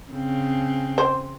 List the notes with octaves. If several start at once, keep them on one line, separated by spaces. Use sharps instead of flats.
C#3 C4
C5